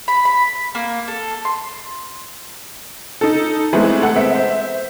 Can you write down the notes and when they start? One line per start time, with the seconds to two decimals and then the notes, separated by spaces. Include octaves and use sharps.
0.08 B5
0.25 B5
0.75 A#3
1.08 A4
1.45 C6
3.21 D#4 A4
3.73 E3 G#3 A3 B3 C4
4.02 A4 F#5
4.16 B3 C4 E5
4.30 C5 E5